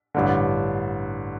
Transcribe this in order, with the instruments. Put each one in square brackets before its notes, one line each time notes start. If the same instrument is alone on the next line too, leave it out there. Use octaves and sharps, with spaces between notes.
[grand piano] A1 G2 D3